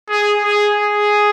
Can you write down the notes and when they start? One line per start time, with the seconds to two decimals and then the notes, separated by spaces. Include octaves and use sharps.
0.09 G#4
0.44 G#4
0.78 G#4